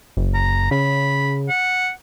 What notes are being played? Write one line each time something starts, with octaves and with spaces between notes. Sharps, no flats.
F#1
A#5
C#3 B5
F#5